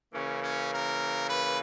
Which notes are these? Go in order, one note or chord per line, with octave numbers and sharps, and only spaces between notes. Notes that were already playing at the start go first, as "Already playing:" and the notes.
C#3 E3 A#3 C#4
C#4
A#4
B4